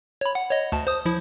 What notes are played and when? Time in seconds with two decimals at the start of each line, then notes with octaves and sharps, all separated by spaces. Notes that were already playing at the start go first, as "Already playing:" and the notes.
0.21 C#5 B5
0.35 F#5
0.51 C#5 D#5
0.72 D2 A5
0.87 C5 D#6
1.06 F3 E4